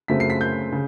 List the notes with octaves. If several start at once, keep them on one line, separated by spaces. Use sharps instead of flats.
F#2 C#3 F#3 A3 C4 B6
C7
B6
G6
C#3